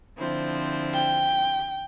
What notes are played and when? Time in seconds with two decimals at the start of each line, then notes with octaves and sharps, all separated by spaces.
0.17 D3 F3 C4 E4
0.94 G5